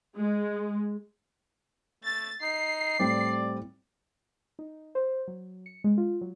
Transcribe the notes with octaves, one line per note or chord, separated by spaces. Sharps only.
G#3
A3 A6
D#4 C7
A2 G3 C4 D5
D#4
C5
F#3
C#7
G#3
F4
F#3